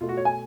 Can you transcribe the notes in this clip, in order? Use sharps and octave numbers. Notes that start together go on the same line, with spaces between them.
B2 A3 F4
F#4
C#5
G#5